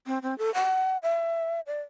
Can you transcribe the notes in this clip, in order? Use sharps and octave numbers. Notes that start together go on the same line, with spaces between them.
C4
C4
A4
F#5
E5
D5